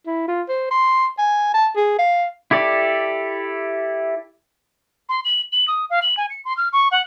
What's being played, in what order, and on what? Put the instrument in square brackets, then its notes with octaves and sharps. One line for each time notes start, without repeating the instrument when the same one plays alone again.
[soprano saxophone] E4
F4
C5
C6
G#5
A5
G#4
F5
[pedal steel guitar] E4 G4 A4 D5
[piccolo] C6
F#7
F#7
D#6
F5
F#7
G#5
C#7
C6
F6
C#6
F#5